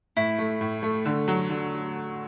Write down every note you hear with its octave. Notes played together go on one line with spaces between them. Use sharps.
A2 E4
A3
A2
A3
D3
F#3
D3